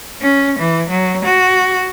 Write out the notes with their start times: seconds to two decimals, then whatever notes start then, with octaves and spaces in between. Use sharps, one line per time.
0.22 C#4
0.59 E3
0.90 F#3
1.25 F#4